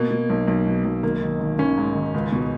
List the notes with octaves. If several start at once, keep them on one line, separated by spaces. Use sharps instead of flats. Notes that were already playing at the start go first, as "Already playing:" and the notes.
Already playing: B2 A#3
B2
B1
B1
B2
B1
G#1 A#3
D#3
G#1
G#1 C#4
G#2
D#3
C#2
B2